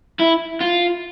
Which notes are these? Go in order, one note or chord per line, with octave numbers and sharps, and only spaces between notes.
E4
F4